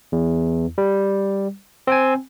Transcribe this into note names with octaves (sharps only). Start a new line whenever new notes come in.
E2
G3
C4 G5 G#5